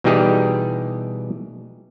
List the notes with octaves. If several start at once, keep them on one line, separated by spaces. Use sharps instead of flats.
B2 E3 G3 D#4 G4 G#4